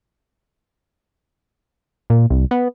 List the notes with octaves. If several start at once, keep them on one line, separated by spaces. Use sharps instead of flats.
A#2
C2
B3